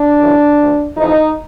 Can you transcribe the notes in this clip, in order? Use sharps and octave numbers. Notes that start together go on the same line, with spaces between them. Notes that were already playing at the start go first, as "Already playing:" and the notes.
Already playing: D4
F#2 C#3 E3
D2 D3
F2 C3 E3 D#4